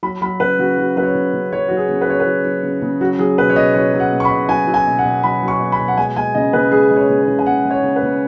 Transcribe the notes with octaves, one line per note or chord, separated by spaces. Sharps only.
F#3 B5
F#3 B5
C#3 B4
C#3 F#4
F#3
F#3 B4
C#5
C#3
C#3
F#3 C#5
F#3 F#4
G#4
C#3
B4
C#3 C#5
B4
F#3
F#3
C#3
C#3
F#3 F#4
F#3 G#4
B2 B4
C#5
B2 D#5
F#3 C#5
F#3
F#5
B2
C#6
B5
B2
F#3 G#5
F#3
G#5
B2
F#5
B2
F#3 B5
F#3
C#6
B2
B5
B2
F#5
G#3 G#5
G#3 G#5
C#3 D#5
C#3 B4
G#3 G#4
G#3
C#5
C#3
C#5
C#3
G#5
G#3 F#5
G#3
C#5
C#3
B4
C#3